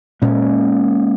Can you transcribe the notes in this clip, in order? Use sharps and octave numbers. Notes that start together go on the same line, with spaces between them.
A#2 G#3 C#4